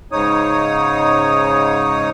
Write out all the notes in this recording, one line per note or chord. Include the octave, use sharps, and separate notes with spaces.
G#2 C#3 D#4 C#5 D#6